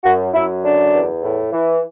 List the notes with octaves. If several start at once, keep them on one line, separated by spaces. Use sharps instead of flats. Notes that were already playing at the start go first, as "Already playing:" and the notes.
F#2 F#4
F#2 E4
D3 D4
E2
A2
E3